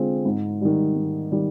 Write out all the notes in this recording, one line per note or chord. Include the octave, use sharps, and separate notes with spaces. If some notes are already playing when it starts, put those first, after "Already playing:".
Already playing: D3 G#3 C4 F4
G#2
D#3 G3
G#2
D#3 G3